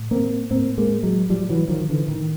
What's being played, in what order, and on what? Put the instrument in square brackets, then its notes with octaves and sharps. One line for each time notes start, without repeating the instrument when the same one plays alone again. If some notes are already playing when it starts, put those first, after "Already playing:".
Already playing: [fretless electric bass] A2
A#3 C4
A2 A#3 C4
G#3 A#3
F#3 G#3
A2 F3 G3
E3 F#3
D#3 F3
D3 E3
A2 D#3